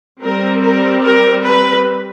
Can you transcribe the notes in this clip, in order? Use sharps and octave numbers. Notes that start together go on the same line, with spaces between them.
G3 C4 A#4
A#4
A#4
B4